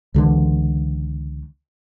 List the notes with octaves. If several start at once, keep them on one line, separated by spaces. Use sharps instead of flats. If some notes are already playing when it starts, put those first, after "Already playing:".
C#2 D3 E3